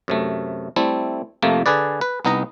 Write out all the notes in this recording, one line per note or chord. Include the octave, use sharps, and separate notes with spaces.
F#2 C3 A3
G3 A3 C4 E4 A4
F2 C3 F3 A3 A#3
D3 G#4 B4 D5
B4
C2 B3 D#4 D#5 A#5